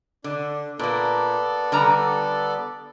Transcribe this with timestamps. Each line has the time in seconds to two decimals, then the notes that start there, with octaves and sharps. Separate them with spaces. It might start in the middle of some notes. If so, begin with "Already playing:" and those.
0.24 D3 D4
0.79 A#2 A#3 B3 A4 D5
1.72 D3 G3 A#5